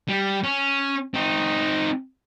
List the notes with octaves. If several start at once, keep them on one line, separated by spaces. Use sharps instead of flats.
G3
C#4
C4 D#4